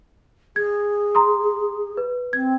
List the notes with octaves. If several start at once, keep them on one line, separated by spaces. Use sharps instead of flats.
G#4 G#6
A#5 C6 D#6
B4
C4 G#6